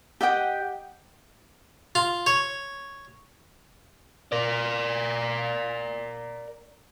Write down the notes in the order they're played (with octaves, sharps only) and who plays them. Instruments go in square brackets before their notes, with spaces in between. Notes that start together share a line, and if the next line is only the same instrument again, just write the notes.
[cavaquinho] G4 D#5 F#5 G5
[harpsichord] F4
C#5
[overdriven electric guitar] A#4 D5